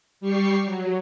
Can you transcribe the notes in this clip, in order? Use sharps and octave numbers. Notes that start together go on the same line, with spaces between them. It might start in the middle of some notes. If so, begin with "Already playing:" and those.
G3 G4 C#6 C7
F#3